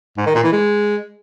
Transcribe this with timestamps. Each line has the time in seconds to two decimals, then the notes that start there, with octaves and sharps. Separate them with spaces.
0.18 G#2
0.26 D#3
0.35 A#2
0.44 E3
0.53 G#3